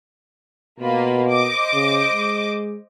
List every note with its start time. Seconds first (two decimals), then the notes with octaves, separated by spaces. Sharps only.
0.80 B2 A#3 F4 B5
1.29 C5 D#5 D6
1.74 C#3
2.12 G#3